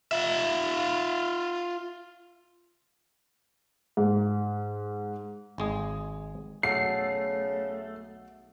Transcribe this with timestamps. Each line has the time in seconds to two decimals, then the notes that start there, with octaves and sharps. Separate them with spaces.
0.12 F4 E5
3.97 G#2
5.58 G#1 G#3 G#4
6.63 B1 C#3 A3 F#5 C7